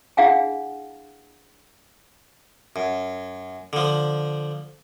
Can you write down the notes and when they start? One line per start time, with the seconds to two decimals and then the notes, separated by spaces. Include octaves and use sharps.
0.17 D4 E4 G#4 F5 F#5 G#5
2.76 F#2
3.73 D3 F3